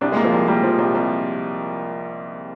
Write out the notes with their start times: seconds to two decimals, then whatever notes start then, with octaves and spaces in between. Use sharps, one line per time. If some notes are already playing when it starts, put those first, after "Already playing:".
0.01 C2 D4
0.12 G#3
0.16 A#3
0.24 F3
0.32 C2
0.48 G3 A#3
0.63 F3
0.78 C2
0.95 C2